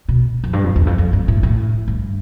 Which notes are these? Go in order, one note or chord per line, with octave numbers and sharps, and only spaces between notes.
B2
F2
G2
F2
E2
F2
F2
G2
A2
A2
G2